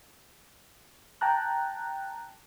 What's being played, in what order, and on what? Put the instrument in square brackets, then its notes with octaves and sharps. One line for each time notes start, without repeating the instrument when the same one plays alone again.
[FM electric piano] G5 A5 A#5 F#6